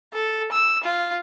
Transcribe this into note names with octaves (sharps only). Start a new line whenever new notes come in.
A4
E6
F4